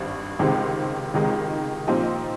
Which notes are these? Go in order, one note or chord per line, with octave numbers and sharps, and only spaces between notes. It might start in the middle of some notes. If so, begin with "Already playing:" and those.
Already playing: G#1 G2
C#2 C3 D#3 G#3 C4
C#2 C3 D#3 G#3 D#4
A#2 F3 C4 D#4 G4